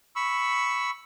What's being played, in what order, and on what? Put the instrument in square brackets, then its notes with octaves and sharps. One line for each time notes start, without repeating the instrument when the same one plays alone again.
[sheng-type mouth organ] B5 C#6 E6